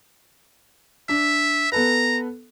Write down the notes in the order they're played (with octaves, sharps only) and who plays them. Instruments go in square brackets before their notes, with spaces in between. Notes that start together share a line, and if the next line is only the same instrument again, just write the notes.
[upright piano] D4 [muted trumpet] E5
[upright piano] B3 A4 B4 [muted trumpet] A#5